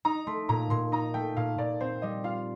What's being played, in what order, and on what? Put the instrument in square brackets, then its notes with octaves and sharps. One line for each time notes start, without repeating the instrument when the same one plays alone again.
[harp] D#4 [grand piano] A#5
[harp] A3 [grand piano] C6
[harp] A#2 [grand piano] A#5
[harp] A#2 [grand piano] C6
[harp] D#4 [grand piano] A#5
[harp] A3 [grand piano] G5
[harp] A#2 [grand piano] F5
[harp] A#2 [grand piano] D5
[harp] C4 [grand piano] C5
[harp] G3 [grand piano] D#5
[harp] F4 [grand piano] F5